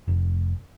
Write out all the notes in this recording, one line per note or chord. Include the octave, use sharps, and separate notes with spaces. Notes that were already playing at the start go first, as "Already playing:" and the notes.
F1